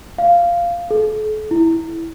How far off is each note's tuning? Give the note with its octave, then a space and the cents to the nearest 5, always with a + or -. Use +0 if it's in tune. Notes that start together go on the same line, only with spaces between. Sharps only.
F5 -10
A4 -40
E4 -5